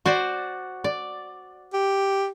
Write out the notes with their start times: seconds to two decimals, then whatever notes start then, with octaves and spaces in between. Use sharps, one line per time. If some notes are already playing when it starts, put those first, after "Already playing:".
0.06 F#4 C5 D5
0.84 D5
1.73 G4